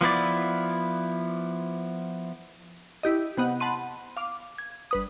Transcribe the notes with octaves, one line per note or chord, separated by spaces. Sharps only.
F3 B3 E4 D5
E4 G4 D#5
C3 B3 D#5 F#5
F#5 A5 B5 C6 D#7
F5 D6
G#6
G1 B4 D#6